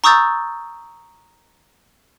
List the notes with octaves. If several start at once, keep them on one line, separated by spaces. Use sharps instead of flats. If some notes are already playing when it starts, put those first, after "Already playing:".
A#5 C#6 D#6 E6 G6 A6